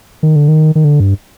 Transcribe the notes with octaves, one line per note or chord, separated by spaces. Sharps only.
D#3
D3
D#3
D#3
D3
G2